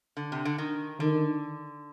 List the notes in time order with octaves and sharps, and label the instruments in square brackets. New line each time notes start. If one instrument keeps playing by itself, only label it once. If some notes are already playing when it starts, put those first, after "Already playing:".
[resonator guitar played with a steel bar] D3
C3
D3
D#3
[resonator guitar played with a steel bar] D3 [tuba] D#3